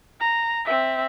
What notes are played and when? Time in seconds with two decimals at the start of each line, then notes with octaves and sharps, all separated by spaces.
0.21 A#5
0.65 C4 E5